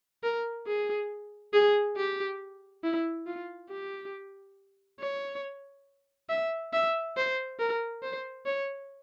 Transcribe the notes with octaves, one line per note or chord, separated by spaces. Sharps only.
A#4
G#4
G#4
G4
E4
F4
G4
C#5
E5
E5
C5
A#4
C5
C#5